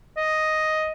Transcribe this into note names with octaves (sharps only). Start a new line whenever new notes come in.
D#5